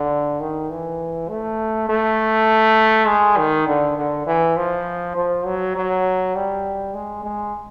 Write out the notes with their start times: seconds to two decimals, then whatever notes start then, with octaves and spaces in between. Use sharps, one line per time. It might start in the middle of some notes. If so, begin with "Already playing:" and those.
Already playing: D3
0.40 D#3
0.70 E3
1.29 A3
1.89 A3
3.07 G#3
3.37 D#3
3.67 D3
3.97 D3
4.26 E3
4.57 F3
5.16 F3
5.45 F#3
5.76 F#3
6.35 G3
6.94 G#3
7.23 G#3